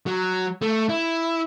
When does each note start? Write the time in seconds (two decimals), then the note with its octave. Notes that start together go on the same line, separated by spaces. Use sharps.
0.06 F#3
0.62 A3
0.89 E4